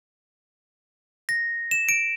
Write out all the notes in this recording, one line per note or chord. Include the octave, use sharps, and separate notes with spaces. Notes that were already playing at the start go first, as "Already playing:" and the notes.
A#6
E7
D7